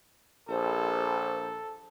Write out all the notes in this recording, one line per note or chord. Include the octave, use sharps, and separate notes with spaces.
A#1 A4 C5